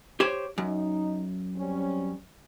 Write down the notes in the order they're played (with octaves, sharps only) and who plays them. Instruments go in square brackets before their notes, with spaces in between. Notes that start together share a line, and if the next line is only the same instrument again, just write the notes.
[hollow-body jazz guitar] G4 C5 C#5
[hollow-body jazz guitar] F#2 [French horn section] D#4
[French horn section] G3 C4 C#4